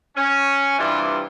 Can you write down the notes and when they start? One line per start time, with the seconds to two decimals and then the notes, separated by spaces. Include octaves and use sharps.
0.16 C#4
0.79 G2 C3 E3 G3 F4